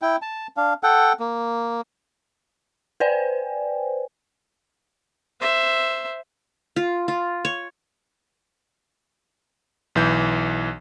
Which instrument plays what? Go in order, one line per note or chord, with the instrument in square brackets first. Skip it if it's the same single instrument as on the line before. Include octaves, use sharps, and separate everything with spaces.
[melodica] E4 G5
A5
D4 F5
A4 F#5 G5
A#3
[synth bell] B4 C5 D5 G5 G#5
[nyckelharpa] C5 E5
[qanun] F4
F4
C#5
[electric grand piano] B1 E3 G6